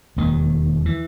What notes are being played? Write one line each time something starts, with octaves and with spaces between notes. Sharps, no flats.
E1 D#2 D#3
E3